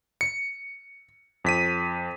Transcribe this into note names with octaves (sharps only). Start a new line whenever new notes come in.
C#7
F2 B6 D#7